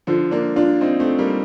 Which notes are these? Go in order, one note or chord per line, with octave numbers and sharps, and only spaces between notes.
D3 F3
A#3 D4
D4 F4
C4 D#4
A3 C4
G3 A#3